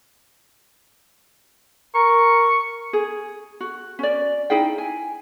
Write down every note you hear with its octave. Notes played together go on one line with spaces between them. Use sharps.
A#4 C#6
G#4
F#4
C#4 D5
D#4 E4 G#4 G5
G#5